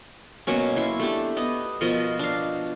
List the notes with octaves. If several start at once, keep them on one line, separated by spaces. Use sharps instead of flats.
B2 F#3 A#3 C#4
E4 C6 C#6
A3 D4 G4
B3 D#5
B2 F3 A#4 D#5
D4 F5